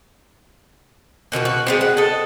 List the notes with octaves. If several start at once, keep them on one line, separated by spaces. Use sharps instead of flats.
B2 D#3 E4 F#4
F#4
G#3 B3 C4
F#5
A4 D#5